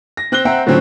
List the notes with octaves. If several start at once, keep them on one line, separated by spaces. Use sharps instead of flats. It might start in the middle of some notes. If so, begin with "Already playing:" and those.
A#6
C4 F#6 A#6 G7
C4 E5 F#5 G5 A#5
A2 D3 F3 F#3 C4 C#4